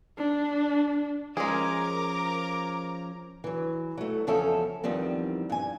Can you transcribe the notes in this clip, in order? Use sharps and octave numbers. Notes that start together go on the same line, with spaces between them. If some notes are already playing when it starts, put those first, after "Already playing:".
D4
F3 G#3 C#4 G#4 A#4 A#5 D6
E3 F#3
F#3 A3
E2 C#3 F3 C#4 A4 E5
E2 D#3 F3 G3 C4
G2 G#5